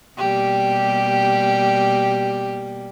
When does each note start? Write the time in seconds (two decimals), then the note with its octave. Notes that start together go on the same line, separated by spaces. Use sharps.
0.18 B2 G3 A#3 G4